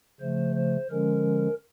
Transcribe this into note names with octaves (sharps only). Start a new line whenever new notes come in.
C#3 F3 A3 C5
C5
D3 F3 G#3 C#4 A#4